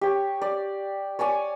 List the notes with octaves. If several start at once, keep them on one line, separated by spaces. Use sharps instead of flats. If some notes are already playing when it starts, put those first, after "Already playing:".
G4 C#5
D5
C#5 D5 G#5 D6